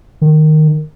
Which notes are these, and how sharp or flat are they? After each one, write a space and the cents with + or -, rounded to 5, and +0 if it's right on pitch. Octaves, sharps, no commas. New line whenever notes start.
D#3 -10